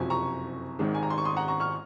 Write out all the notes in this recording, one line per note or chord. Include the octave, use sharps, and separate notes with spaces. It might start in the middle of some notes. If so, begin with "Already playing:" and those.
Already playing: F#1 F2 C3 F#3 G#5
A#5 C#6
G#1 G#2 D#3 G#3
G#5
A#5
C6
C#6
C6 D#6
F#5 A#5
A#5 C#6
C#6 F6